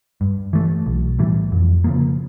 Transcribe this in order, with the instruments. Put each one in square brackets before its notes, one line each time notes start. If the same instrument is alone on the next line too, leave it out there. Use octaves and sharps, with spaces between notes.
[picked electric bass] G2
E3 A3
B1
A2 E3 G3
F2
C#3 F3 A#3